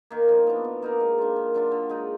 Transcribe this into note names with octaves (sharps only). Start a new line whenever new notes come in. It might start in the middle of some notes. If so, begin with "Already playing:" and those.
D#3 A#3
F3
B3 D4
B2
A#3 D#4 A#4
G#3
D4 F4
D#3
F#3 D4 F4
D3
G#3 D#4